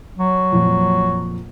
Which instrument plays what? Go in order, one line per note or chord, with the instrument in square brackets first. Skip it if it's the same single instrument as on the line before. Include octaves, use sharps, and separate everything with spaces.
[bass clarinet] F#3
[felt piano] F2 A#2